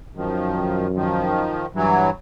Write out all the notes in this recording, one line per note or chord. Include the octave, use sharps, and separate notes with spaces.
F#2 D#3 F3
D#3 F3
G2 E3 F#3